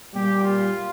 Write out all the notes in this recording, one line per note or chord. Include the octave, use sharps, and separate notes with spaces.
A#2 G3 G4
F4